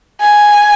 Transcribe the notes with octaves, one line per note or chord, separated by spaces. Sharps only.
G#5